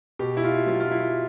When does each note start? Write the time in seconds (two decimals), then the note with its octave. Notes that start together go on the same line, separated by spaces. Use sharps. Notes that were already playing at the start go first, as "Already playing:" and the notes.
0.19 B2 G4
0.37 E4
0.44 F4
0.66 F#3 F4
0.80 F4
0.91 E4